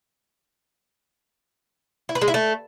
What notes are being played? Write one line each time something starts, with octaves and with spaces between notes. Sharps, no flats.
E4
B4
G#3
E4
A3